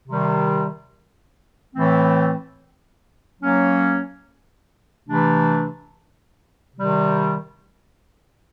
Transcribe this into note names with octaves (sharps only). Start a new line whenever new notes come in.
C3 D#3 G3
A2 E3 A3 C4
F#3 A#3 C#4
C3 E3 A3 D4
C3 D#3 G3